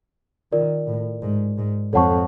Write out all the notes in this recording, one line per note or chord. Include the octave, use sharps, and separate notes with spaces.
D#3 F4 A#4 D5
A2
G#2
G#2
F2 A4 C#5 F#5 A5 C#6